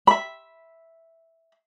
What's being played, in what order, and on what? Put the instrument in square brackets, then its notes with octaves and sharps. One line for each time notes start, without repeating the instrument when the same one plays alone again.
[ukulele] E5 B5